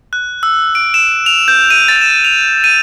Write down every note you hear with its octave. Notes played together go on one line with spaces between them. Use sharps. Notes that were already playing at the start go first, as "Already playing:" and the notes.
F#6
E6
D7
E7
F7
G6
D#7
A6
E7
F7
D#7